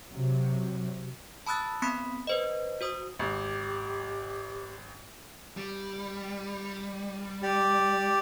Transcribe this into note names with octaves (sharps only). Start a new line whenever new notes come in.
C3 F#3
A5 B5 D#6 E6 F#6 A6
B3 C4 B5 C6 D#6 B6
B4 C5 D#5
F#4 C5 D#6
G#1 G4
G3
G4 D5